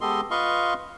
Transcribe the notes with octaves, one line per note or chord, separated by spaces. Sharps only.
G#3 B3 G4 A4 D#5 C6
F4 B4 D#5 F5 C6 C#6